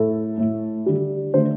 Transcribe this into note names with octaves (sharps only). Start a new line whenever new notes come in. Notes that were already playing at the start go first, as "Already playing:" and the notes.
Already playing: A2 A3 A4
A2 A3
D3 G3
D3 A3 C5